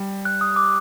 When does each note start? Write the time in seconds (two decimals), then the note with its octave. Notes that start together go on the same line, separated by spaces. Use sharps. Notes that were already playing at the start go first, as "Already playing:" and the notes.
Already playing: G3
0.25 F#6
0.41 D#6
0.56 D6